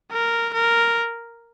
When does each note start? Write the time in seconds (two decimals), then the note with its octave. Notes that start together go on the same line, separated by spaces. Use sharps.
0.12 A#4
0.54 A#4